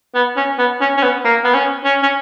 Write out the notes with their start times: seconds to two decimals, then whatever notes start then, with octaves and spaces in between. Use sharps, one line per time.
0.15 B3
0.37 C#4
0.58 B3
0.81 C#4
0.97 C#4
1.03 B3
1.25 A#3
1.44 B3
1.54 C#4
1.84 C#4
2.03 C#4